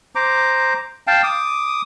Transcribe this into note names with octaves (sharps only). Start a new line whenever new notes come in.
C5 A#5 D6
F5 G5 A5
D6 D#6